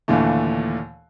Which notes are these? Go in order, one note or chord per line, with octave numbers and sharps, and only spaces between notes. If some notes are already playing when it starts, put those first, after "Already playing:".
D#2 A#2 D3 E3 A3